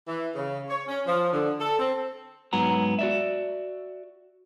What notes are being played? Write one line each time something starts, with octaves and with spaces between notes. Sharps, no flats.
E3
C#3
C#5
C#4
F3
D3
A4
C4
G#2 F#3 B3 A#5
F#4 D5 E5